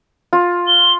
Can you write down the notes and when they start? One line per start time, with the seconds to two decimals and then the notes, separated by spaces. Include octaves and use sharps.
0.33 F4
0.67 G7